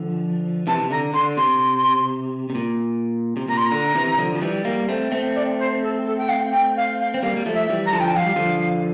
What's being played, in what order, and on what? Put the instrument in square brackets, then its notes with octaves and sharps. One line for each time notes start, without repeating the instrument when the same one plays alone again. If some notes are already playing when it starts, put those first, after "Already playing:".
Already playing: [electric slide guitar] D3 F3
[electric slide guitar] C3 E3 [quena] A5
[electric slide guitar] C3
[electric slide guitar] D3 [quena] A#5
[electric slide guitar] D3 [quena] C6
[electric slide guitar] C3 [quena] C6
[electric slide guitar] C3
A#2
C3
[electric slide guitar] A#2 [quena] A#5
[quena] C6
A#5
[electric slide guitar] D3
C3 E3
D3 F3
F3
E3 G3
G3 A#3
A3 C4
A3 C4
[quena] D5
C5
A4
A4
G5
F5
G5
F5
F5
[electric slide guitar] C4
[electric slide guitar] G3 A#3 [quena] F5
[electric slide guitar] G3
F3 A3
[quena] E5
[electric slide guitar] E3 G3
[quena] A#5
[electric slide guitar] D3 F3 [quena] A5
[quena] G5
A5
[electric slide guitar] F3 [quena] F5
[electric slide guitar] G3
D3 F3